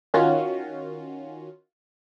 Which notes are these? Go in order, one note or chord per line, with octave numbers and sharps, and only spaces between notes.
D#3 C#4 F4 F#4